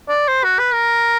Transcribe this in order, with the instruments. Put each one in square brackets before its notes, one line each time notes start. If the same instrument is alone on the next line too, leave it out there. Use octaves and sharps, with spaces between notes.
[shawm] D5
C5
F#4
B4
A#4